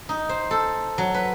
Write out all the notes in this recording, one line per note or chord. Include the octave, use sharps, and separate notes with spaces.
D#4
C5
A4
F#3
B4